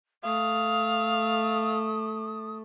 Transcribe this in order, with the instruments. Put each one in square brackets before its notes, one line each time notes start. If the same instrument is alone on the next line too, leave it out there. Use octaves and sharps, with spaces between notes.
[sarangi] A3 [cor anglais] F5 [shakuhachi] D#6